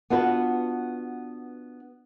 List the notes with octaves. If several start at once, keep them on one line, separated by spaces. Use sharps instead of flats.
B3 D4 F4 F#4 B4